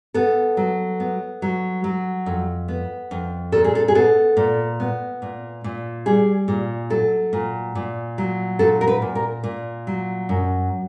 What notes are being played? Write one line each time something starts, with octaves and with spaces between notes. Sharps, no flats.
B3 A4
F#3
B3
F#3
F#3
F2
B3
F2
A#2 A4
G#4
A4
G#4
B3 A4
A#2
B3
A#2
A#2
G3 G#4
A#2
F#3 A4
A#2
A#2
F#3
A#2 A4
A#4
B4
A#2
A#4
A#2
F#3
F#2